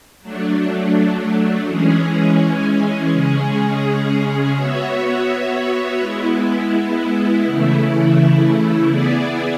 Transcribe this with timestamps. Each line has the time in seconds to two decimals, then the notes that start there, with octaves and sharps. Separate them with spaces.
0.22 F#3 A3 D4
1.67 E3 G#3 C#4 G#4
3.11 C#3 G#3 C#4 G#4
4.55 B3 F#4 C#5 E5
5.99 G#3 B3 E4
7.43 C#3 E3 A3 E4
8.88 B3 E4 G#4 D5